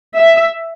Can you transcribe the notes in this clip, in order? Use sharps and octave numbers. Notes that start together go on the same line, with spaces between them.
E5